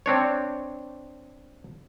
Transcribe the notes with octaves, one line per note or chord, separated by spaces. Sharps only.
C4 D4 C#5